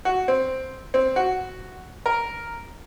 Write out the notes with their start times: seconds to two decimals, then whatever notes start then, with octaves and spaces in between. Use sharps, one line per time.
0.05 F#4
0.28 C4
0.94 C4
1.16 F#4
2.06 A#4